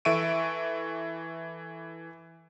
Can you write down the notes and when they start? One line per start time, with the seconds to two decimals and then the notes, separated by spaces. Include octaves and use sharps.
0.05 E3 A4 E5 C#6 D7 D#7